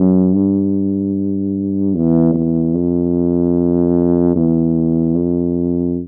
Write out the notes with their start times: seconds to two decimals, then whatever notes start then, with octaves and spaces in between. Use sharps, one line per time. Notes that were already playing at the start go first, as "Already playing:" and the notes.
Already playing: F#2
0.33 G2
1.95 E2
2.34 E2
2.74 F2
4.36 E2
5.16 F2